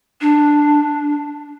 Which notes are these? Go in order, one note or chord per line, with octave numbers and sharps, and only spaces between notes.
D4